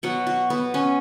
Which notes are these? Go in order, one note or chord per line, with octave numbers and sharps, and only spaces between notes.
B2 F#3 B3 F#5
F#4
B3
C#4